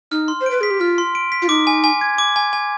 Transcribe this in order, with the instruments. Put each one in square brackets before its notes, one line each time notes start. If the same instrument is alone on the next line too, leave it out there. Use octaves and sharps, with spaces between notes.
[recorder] D#4 [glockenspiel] F6
[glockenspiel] C6
[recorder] C5
[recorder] B4 [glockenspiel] D7
[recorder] G#4 [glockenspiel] B6
[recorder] G4
[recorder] F4 [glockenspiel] F6
[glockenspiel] C6
D7
B6
[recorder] F4
[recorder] D#4 [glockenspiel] D6
[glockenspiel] G#5
G#5
G#6
D6
G#5
G#5